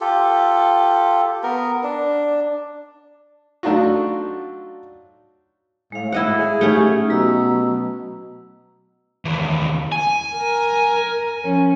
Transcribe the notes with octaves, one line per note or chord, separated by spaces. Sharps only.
F4 G4 A4
B3 A#4
D4
F#3 A3 D4 D#4 F4 F#4
A2 G#3 F5
E4 D#5 F#5
G#4
A3 C#4 D#4 G4 F#5
B2 F#3 A#5 E6
D#2 E3
G#5
A#4
F3 C#4